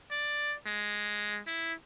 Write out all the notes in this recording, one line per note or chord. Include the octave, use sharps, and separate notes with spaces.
D5
G#3
E4